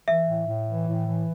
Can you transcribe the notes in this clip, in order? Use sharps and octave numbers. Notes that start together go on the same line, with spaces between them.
E3 E5
A2
A2
E3
A2
E3